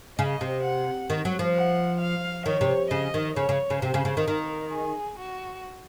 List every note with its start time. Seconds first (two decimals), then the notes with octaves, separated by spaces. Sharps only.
0.19 C#3 D#5
0.41 C3
0.64 F#5
1.10 D#3
1.25 F#3
1.39 F3
1.55 F#5
2.00 F5
2.46 D#3 C#5
2.61 C3
2.91 C#3 D#5
3.14 D#3
3.36 C#3 C#5
3.49 C#3
3.70 C#3
3.82 C3 C5
3.94 C#3
4.05 C#3
4.17 D#3
4.28 D#3 A#4
4.73 G#4
5.18 F#4